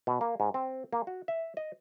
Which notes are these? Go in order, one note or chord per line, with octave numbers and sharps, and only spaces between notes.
B2
A#3
G#2
C4
A#3
F#4
E5
D#5